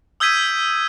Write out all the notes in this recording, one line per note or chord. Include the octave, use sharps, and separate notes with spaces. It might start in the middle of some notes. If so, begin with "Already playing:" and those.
D#6 E6 G6 G#6 B6 D#7